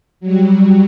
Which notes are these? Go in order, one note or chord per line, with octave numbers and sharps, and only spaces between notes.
F#3 G3